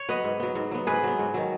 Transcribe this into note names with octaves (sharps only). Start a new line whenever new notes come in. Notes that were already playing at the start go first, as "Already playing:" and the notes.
Already playing: C#5
F#3 B3 B4 D#5
G#2
F#3 B3
G#2
F#3 B3
G#2 G#4 B4
F#3 B3
G#2
D#3 F#3